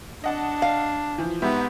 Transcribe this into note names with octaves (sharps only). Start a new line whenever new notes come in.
D4 D#5 F#5 A5
F5
E3 F3
G#2 B3 G4 E5